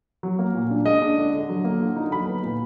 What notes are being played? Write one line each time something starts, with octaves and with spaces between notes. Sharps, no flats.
F#3
A#3
A#2
D4
G#3 D#5
D4
D3
D3
F#3
A#3
D3
D#4
F#3 B5
B3
A#2